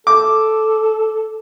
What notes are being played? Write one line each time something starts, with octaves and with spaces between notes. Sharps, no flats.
A4 D6